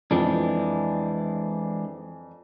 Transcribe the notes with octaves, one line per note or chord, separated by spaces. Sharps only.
F2 E3 G#3 D4